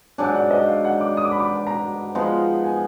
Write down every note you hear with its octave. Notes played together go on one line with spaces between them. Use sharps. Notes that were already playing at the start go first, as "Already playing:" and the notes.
G#2 F#3 D4 G#5
F#5
D#5
F5
F#5
D6
D#6
D6
B5
D6
A#5
F3 G#3 B3 D#4
G#5